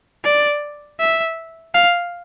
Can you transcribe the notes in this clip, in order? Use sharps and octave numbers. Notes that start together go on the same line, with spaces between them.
D5
E5
F5